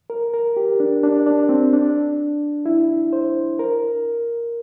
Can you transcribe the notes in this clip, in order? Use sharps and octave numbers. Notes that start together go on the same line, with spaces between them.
A#4
A#4
G4
D4
D4
D4
C4
D4
E4
C5
A#4